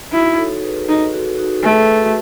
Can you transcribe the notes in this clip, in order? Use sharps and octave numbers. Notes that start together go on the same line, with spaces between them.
D#4 E4 F#4
A4 C#5
G#4 B4
D#4
F#4 A4
D#4 F#4
A4
A3 G#4 B4
F#4 A4